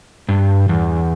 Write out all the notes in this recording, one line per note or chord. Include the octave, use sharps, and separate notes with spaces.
G2
E2